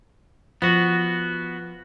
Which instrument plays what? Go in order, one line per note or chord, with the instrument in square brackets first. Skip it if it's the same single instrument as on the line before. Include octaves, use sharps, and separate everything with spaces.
[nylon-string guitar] F3 [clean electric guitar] B3 F#4